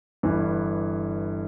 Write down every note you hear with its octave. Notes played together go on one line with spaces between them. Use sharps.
G1 G2 E3